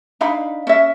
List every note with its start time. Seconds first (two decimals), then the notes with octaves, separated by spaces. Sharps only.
0.21 D4 D#4 F5 B5
0.67 C#4 E5